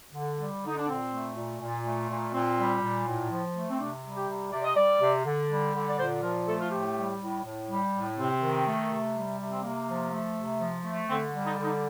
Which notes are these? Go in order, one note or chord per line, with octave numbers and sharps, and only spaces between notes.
D3
G3
D3 D#4
D4
A#2 C4
A3
A#2
A#2
A3
A#2
A#2 C4
G3
A#2
A2
F3
A3
C4
C3 D4
G3
G4
C3
C3 D5
D#5
G3 D5
C3
D3
G3
D3
D5
A#2 C5
F3 A#4
A3 A4
F4
A2 G4
G3
A2
A2
G3
A2
C3 C4
D#3
A3
C3
G3
C3
C4
C3 A#3
F3
A3
C3
F3
A3
D3 C4
G3
D#4
D3
D#4